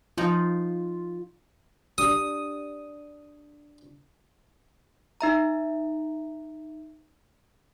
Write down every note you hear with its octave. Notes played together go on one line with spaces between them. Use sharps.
F3 D#4 F4
D4 G4 D#6
D#4 E5 A#5